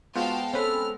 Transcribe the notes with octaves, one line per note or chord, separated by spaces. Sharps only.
G#3 B3 F4 F#4 C5 F5 G5 A5
C4 C#4 A4 B4 F6